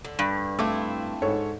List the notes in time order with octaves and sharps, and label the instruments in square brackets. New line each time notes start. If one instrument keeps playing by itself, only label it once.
[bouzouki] D3
[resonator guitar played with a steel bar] G2
[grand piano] A3 [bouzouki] C4 E4 F4 [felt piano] D6
[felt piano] G#2 A4 C#5